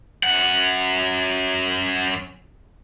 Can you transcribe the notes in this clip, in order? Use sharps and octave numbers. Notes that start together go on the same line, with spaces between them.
F#2 F#5